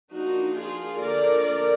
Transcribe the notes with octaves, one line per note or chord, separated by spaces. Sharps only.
F3 A#3 D4 D#4 F#4
F4 G#4
D3 F3 A#3 D4 A#4 D5
A#4 D5